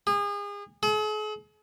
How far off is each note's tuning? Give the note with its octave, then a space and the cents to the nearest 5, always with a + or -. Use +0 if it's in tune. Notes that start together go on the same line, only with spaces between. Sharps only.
G#4 -35
G#4 +45